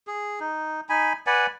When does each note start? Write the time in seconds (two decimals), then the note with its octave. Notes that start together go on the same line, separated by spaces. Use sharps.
0.07 G#4
0.40 D#4
0.89 D#4 G#5 B5
1.27 B4 D5 F#5 G#5